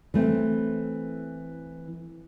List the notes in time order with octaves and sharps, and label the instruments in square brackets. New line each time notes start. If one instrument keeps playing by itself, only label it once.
[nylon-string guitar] E3 A3 C4